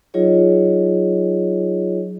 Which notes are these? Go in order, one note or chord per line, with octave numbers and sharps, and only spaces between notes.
F#3 D#4 F4 G#4 C#5 D#5